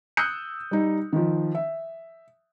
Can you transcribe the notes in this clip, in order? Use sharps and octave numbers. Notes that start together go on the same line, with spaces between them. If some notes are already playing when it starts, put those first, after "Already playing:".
D#6 E6 F#6 G6 C#7
G3 D#4
D#3 F3
E5